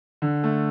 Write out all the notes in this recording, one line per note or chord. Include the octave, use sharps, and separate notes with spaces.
D3
A3